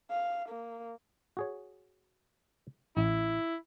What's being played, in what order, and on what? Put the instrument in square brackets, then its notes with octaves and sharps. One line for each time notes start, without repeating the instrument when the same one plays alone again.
[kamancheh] F5
A#3
[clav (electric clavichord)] F#4 G#4 C#5
[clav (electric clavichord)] A1 [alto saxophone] E4